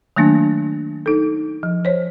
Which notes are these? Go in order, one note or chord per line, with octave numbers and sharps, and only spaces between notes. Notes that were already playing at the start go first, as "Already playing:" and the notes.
D#3 F#3 A3 A#3 D4
D#4 A4
F3
C5 C#5